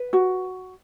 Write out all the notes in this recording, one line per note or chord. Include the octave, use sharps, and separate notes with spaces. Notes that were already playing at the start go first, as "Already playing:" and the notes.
Already playing: B4
F#4